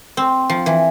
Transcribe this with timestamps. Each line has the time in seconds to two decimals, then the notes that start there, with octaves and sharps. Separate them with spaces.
0.17 C4
0.50 F3
0.66 E3